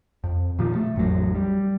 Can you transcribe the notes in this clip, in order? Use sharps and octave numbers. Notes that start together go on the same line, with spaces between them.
F2
A#2 D#3 F3
A3
A1 F2 F#3
G3